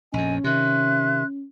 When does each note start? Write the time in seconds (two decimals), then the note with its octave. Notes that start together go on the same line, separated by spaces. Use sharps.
0.13 A#1 F2 C#4 D#5 G#5
0.44 C3 D#3 E5 C6 F#6